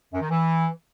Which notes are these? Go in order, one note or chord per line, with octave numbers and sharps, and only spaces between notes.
F#2
D#3
E3